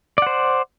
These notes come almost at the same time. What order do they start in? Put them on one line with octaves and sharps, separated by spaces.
D5 F#5 C5